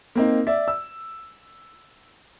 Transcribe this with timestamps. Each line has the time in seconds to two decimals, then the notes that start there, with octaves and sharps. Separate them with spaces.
0.15 A#3 C4 D#4
0.47 D5 E5
0.68 E6